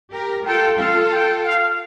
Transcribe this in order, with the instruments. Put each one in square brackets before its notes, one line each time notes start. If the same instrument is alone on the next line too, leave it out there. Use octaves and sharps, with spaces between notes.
[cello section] G4 A#4
[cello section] F4 A4 [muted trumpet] G5
[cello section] F4 A4 [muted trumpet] F5
[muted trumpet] G5
F5